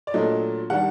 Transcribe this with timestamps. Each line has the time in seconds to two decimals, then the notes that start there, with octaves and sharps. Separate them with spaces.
0.07 D5
0.14 A#2 F#3 A3 D4 D#5
0.70 D#3 G3 D4 F#5